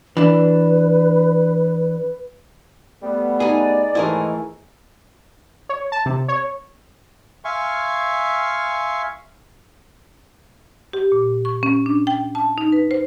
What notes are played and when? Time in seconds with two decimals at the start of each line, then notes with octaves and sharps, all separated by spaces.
0.17 E3 D4 B4
3.02 G3 A3 B3
3.40 D#4 G#4 D5
3.95 G#2 D#3 E3 A3 E4 G#4 A#4
5.69 C#5
5.92 A5
6.06 C3
6.28 C#5
7.45 E5 F5 G#5 C6 C#6
10.93 G4
11.12 A#2
11.45 C#6
11.63 C#4
11.86 D4
12.07 G5
12.35 A5
12.58 D#4
12.72 B4
12.91 C5